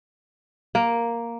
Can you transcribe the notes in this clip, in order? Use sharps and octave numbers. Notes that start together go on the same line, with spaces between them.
A#3